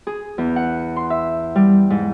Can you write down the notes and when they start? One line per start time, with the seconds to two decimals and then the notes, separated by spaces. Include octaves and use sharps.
0.07 G#4
0.38 E2
0.56 F#5
0.96 C6
1.10 E5
1.55 G3
1.90 G#2